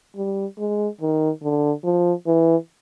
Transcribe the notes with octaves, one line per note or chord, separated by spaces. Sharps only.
G3
G#3
D#3
D3
F3
E3